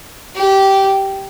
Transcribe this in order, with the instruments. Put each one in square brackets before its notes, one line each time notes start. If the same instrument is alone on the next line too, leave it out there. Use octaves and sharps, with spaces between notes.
[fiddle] G4